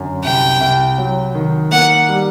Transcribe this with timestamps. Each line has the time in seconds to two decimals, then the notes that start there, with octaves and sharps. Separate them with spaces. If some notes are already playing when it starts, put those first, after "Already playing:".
Already playing: F#2 D3
0.24 C2 G5
0.61 C2
0.98 F#3
1.35 D#3
1.72 A#3 F#5
2.09 G3